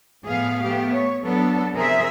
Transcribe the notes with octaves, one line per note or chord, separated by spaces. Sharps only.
A2 F3 B3 G#4 F5
A3 B3 G4
C#5
F#3 B3 D4 A4
C3 F3 G#4 A#4 C5 E5